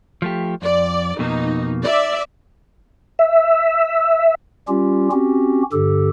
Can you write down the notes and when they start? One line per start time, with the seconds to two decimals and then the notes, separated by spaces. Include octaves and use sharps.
0.22 F3 A3 G4
0.62 F2 D5
1.19 F2 B2 A#3 D#4
1.83 D5 E5
3.19 E5
4.68 G3 C#4 F4 G4
5.11 C4 C#4 F#4 G4
5.72 G2 D3 G4 A4